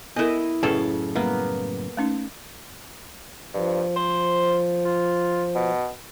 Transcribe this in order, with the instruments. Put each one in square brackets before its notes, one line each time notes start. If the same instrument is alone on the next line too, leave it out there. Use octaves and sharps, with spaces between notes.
[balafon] B3 A4 A#4 [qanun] E4 D#5
[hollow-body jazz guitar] F#2 A2 C#3 [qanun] A4 [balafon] B4
[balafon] G3 [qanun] A#3 B3
[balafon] A3 C#4 D#4
[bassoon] G2 [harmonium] F3
[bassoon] C5
F4
B2